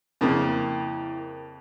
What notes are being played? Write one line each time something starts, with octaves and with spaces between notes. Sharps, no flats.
F2 C#3 A#3 E4 A#4 G5